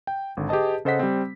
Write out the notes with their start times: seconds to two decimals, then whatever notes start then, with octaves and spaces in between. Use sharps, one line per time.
0.07 G5
0.37 G#1 D3
0.49 G4 G#4 B4 D#5 A5
0.85 C#3 A4 C5 D#5 F#5 B6
0.99 G3 C4